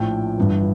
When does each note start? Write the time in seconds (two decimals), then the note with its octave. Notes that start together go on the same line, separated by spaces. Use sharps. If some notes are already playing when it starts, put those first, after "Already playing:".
Already playing: A#1 A2 F3 G5
0.38 G1 G2 E3